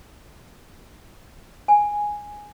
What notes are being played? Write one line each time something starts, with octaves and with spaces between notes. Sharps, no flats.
G#5